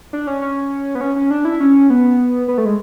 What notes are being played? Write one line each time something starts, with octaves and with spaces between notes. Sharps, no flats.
D4
C#4
C#4
B3
C#4
C#4
D4
E4
C#4
B3
B3
A3
G#3